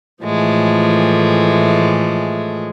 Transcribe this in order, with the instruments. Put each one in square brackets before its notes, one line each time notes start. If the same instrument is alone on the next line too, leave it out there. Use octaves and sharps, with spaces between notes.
[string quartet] A2 E3 F3 G#3 A3